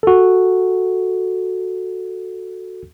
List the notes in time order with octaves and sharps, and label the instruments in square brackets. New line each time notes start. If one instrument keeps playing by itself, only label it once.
[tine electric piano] F#4 A4